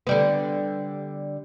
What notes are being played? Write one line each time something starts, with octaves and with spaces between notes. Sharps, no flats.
D3 G3 B3